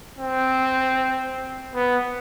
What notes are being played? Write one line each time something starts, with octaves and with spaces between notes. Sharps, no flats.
C4
B3